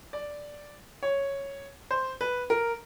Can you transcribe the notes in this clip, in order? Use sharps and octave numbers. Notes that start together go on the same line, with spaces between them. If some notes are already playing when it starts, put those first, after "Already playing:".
D5
C#5
C5
B4
A#4